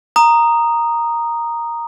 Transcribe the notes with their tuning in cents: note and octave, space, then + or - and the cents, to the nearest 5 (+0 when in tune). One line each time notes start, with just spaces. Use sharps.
A#5 +0 D#6 -10